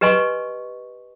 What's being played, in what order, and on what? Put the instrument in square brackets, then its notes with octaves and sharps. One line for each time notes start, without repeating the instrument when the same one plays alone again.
[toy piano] G4 B4 D#5 G#5 C6 C#6